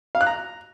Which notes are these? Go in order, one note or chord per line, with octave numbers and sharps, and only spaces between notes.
F5
F#6
A#5